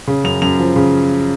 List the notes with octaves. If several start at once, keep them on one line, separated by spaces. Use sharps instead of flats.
C#3
F#2 F7
F#2 F7
F3
C#3